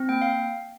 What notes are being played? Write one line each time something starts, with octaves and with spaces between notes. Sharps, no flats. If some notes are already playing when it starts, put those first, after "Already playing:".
Already playing: C4
A#3 G5
F5